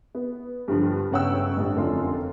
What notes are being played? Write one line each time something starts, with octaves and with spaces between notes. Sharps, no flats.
B3
G2 D3 F3
G1 C#3 C#5 F#5 G5 E6
A1 G2 D3
F1 F#2 D3 D4 F4 C6